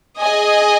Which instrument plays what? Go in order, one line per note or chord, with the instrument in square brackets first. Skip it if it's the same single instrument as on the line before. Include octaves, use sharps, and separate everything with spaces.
[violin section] G#4 D#5 G#5